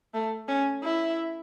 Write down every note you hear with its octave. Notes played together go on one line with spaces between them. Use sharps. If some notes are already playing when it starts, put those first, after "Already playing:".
A3
C#4
E4